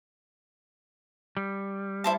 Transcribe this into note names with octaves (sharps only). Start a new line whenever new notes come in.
G3
E4 C5 A5